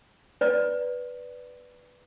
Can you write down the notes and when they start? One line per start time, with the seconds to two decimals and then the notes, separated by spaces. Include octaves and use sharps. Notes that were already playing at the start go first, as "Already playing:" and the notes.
0.41 B4 D5